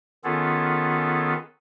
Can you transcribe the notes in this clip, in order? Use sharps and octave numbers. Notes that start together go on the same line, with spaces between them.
D#3 B3 C#4 F4 G#4 A4